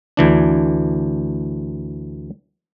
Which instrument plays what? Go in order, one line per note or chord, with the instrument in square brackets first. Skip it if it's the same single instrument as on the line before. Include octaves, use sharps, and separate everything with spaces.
[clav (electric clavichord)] D2 E3 D4